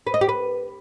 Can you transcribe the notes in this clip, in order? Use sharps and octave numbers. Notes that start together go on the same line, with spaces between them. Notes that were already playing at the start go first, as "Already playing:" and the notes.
B4
D#5
G4
B4